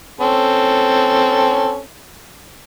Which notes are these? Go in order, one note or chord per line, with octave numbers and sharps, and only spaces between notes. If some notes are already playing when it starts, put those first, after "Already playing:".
C4 C#4 A4